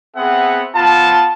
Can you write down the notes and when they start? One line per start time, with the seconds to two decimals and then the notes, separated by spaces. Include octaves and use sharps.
0.15 B3 C4 G#4 E5 F#5
0.75 B3 F4 A5